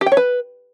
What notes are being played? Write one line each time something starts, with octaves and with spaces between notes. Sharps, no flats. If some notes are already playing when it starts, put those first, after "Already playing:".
G4
G5
C#5
B4